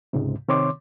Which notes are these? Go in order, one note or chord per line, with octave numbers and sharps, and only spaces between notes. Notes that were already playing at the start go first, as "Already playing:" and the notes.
C#2 G#2 C3
C3 D#3 C4 C#5 C6 D6